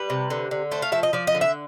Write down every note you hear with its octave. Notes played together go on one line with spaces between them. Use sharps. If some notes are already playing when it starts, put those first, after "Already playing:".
Already playing: G3 B4
C3
D3
D3
A3 C5
F5
F3 E5
D#5
F3 D5
D#5
D3
E5